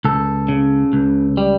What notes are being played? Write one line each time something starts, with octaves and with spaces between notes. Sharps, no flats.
C#2 A4
C#3
C#2
G3